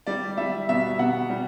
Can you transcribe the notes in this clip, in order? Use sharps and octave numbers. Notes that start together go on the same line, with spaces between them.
G3 D5
G3 E5
B2 E5
B2 F#5
G3